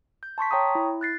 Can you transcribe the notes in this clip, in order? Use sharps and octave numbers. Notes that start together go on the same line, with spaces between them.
G6
A5 C6 C#6 B6
C#5 G5 A#5 C#6 D#6
E4
F#6 A6 C7